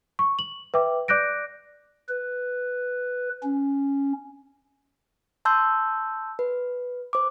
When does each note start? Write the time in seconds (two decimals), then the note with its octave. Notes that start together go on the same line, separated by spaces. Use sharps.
0.19 C#6
0.39 F#7
0.74 B4 E5 G5 D6
1.08 D5 D6 F#6 G6 A#6 D7
2.09 B4
3.43 C#4
5.45 A5 C6 E6 G6
6.39 B4
7.13 C5 D6